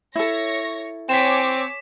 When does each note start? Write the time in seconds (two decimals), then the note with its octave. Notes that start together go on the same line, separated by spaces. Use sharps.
0.16 E4 A4 C#5 C#6 A#6
1.09 C4 C#5 G#5 D6 B6 E7